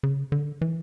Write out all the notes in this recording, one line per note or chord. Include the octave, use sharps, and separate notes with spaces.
C#3
D3
E3